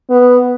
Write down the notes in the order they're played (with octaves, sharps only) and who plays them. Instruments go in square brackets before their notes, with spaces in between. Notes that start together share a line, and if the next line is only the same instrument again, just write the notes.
[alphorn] B3